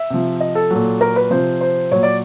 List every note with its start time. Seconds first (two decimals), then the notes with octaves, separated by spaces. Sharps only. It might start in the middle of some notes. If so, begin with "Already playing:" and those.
Already playing: E5
0.10 C3 F3
0.40 D#5
0.55 A4
0.71 A#2 F#3
1.01 A#4
1.16 B4
1.30 C3 F3 C5
1.61 C5
1.91 A#2 F#3 C#5
2.03 D5